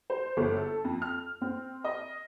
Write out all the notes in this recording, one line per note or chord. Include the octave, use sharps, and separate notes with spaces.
C5
G1
A4
F2
F6
C4
D#5